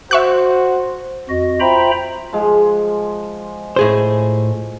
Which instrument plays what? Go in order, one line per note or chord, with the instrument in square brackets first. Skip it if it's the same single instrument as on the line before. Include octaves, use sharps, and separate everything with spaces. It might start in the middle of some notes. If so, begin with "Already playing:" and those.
[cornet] F#4 [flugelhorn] C5 [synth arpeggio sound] E5 C#6 F#6
[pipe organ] F2 F#4 D#5
F4 C5 E5 G5 A#5 B5
[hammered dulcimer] F3 G#3
[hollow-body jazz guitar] A2 G#4 C5